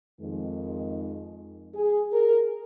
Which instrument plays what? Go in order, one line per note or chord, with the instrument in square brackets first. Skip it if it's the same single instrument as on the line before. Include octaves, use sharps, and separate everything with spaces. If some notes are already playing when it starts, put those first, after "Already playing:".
[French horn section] F2 D#3 G#3
G#4
A#4